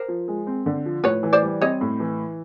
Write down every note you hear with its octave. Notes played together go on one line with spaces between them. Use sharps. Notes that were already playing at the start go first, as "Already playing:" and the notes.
Already playing: A#4 C5
F3
G#3
C4
D3
F3
A2 B4 C#5
E3
C5 D5
G3
C4 C#5 D#5
A2
E3